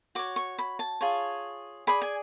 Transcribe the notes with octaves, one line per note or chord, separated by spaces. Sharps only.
F#4 C#5 D6
C#6
B5
A5
F4 G#4 C#5
G#4 D5 B5
G#5